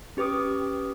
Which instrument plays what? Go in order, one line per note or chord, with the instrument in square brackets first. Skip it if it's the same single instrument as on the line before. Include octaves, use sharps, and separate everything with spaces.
[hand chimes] C#4 G4 B4 D6 D#6